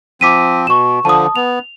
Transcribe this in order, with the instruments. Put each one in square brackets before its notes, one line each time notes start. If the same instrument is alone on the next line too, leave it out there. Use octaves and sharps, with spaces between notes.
[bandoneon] F3 C4 [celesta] D6 B6 D#7
[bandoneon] B2 [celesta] C#6 E7
[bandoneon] D3 F3 [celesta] A5 D#6
[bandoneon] B3 [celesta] F7